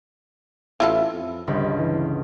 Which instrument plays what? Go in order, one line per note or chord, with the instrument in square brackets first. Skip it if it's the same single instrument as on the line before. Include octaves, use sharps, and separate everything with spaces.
[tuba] A1 [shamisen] E4 F4 A4
[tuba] F2
[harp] G1 C#2 B5 [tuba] G2
[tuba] E3